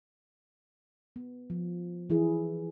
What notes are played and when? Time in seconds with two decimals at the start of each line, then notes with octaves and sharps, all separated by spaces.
1.16 B3
1.50 F3
2.10 E3 E4 G#4